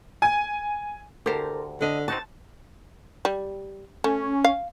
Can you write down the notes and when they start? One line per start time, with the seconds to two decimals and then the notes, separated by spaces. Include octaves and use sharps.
0.22 G#5
1.26 D2 G4 A4 A#4 C5
1.81 D3 A4 D#5
2.08 C4 D#4 F#4 A5
3.25 G3
4.04 A3 C#4
4.44 F5